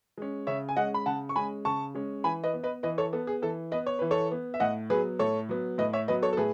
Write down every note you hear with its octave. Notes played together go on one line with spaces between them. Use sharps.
G#3 C#4
C#3 C#5 E5
G#5
G#3 C#4 D#5 F#5
B5
C#3 F#5 A5
C#6
G#3 C#4 G#5 B5
C#3 A5 C#6
G#3 C#4
E3 G#5 B5
B4 D#5
B3
B4 D#5
E3 B4 D#5
A4 C#5
B3 A4
G#4
E3 A4
B3 B4 D#5
C#5
E3 B4
A4 C#5
B3
E5
A2 D#5 F#5
F#3 B3 G#4 B4
A2 A4 C#5
F#3 B3
A2 B4 D#5
C#5 E5
F#3 B3 B4 D#5
A4 C#5
A4
A2 G#4 B4